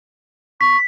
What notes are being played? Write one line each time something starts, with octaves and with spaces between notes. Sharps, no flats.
C#6 B6